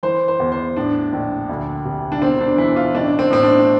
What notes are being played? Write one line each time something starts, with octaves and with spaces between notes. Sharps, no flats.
E3 C5
C5
E2
C5
A2 D4
A#1
D2
C3
D4
E1 C4
D4
E3 E4
F4
A1 D4
C4
A2 C4
D4